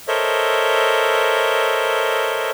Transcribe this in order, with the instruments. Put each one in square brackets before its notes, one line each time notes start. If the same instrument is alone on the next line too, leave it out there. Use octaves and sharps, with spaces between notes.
[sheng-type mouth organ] A4 A#4 C5 C#5 D#5 E5